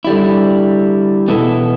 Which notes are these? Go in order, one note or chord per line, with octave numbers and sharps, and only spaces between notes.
D3 G3 E4
E2 B2 B3 E4 A4